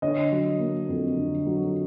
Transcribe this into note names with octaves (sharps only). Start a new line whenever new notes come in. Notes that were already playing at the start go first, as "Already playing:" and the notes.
D3 C#5 D#5
F#3
A#3
F2
D3
F#3